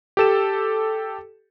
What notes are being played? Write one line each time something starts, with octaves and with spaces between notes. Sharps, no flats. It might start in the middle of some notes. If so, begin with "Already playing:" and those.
G4 A4 E7